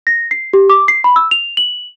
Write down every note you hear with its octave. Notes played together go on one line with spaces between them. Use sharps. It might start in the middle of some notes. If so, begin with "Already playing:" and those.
A#6
C7
G4
D6
C7
B5
E6
F7
F#7